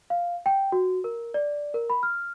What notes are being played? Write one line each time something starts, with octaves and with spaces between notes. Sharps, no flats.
F5
G5
F#4
A#4
D5
A#4
B5
F6